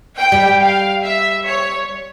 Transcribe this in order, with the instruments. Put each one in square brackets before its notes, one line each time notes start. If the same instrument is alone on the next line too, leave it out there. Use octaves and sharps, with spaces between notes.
[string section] G5
[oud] G3
[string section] F5
E5
C#5